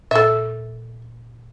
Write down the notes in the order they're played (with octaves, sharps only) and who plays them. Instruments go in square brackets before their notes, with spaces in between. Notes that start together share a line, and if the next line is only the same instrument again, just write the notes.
[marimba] A#2 E6 [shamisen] A4 E5